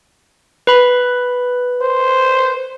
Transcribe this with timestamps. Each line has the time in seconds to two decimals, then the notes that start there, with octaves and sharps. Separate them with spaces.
0.67 B4 B5
1.82 C5